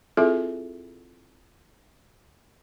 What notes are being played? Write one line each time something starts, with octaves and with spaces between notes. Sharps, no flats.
C4 E4 F4 G#4 A4 E5